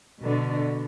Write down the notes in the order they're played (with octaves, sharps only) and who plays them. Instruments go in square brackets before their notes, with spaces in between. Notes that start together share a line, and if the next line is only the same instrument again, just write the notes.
[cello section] B2 D3